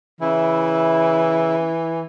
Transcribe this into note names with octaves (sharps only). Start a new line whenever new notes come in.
C#3 E3 E4